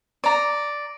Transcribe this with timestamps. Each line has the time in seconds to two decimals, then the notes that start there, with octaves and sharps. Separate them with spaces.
0.24 D5 A#5